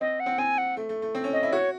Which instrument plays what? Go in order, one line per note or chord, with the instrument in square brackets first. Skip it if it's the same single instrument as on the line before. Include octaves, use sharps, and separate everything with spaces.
[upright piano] C4 [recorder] D#5
[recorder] F#5
[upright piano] C4
[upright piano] C4 [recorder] G#5
[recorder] F#5
[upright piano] A3
A3
A3
C4
C#4
[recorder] D#5
[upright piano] E4
[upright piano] F#4 [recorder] C#5